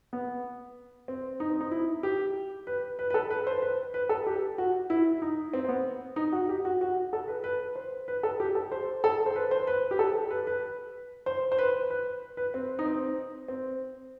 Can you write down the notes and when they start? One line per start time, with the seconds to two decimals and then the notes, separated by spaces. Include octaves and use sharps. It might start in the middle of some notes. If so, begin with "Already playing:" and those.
0.13 B3
1.08 C4
1.40 D#4
1.50 C4
1.61 D#4
1.71 E4
2.03 G4
2.67 B4
2.99 B4
3.10 B4
3.14 A4
3.30 B4
3.47 C5
3.62 B4
3.94 B4
4.09 A4
4.26 G4
4.58 F#4
4.90 E4
5.22 D#4
5.53 C4
5.65 C4
5.69 B3
6.16 D#4
6.32 F#4
6.49 G4
6.65 F#4
6.81 F#4
7.13 A4
7.28 B4
7.44 B4
7.75 C5
8.08 B4
8.23 A4
8.40 G4
8.55 A4
8.72 C5
9.04 A4
9.26 C5
9.36 B4
9.51 C5
9.67 B4
9.91 G4
9.99 A4
10.31 B4
10.47 B4
11.26 C5
11.52 C5
11.58 B4
11.90 B4
12.37 B4
12.54 C4
12.79 D#4
12.86 C4
13.48 C4